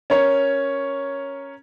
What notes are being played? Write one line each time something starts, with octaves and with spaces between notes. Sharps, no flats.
C#4 A#4 C#5